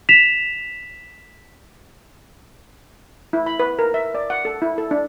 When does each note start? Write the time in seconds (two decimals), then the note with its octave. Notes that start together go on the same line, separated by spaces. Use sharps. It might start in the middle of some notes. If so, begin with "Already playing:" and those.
0.09 B6 E7 F7
3.33 E4
3.46 B5
3.60 B4
3.79 A#4
3.94 E5
4.15 D5
4.30 F#5
4.45 A4
4.62 E4
4.78 A4
4.91 D4